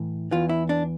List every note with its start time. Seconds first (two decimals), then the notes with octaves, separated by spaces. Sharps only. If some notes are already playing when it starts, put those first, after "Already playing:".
Already playing: A2 E3
0.31 E2 E3 F4
0.49 E4
0.69 D4